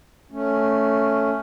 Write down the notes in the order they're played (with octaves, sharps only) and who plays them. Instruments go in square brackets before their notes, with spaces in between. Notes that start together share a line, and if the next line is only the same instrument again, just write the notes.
[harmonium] A3 C#4